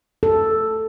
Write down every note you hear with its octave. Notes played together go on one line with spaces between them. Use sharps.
A4